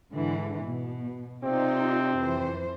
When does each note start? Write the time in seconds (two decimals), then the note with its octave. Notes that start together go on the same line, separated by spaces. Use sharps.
0.13 G#2 D3 E3
0.65 B2
1.44 C3 C4 D#4 F4 D5
2.17 F2 E3 C5